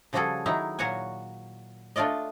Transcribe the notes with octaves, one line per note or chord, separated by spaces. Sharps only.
C#3 F3 G3 F#4 G#4 A4
D#3 F#3 D#4 E4
A#2 F#3 F#4 C#5 F#5 G#5
A3 D4 F4 D5 D#5